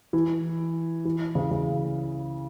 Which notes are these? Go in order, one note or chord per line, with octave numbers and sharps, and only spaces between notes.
E3
E3
C#3
C#3